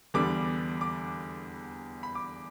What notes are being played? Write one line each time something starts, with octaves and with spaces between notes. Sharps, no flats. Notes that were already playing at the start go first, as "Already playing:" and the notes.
E2 D3 G3 B3 D6
D6
B5
D6